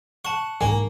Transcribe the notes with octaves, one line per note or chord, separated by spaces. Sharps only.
F#5 A5 C#6
G#2 E3 A#3 G#5